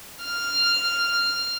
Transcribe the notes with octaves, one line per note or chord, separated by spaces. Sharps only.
F6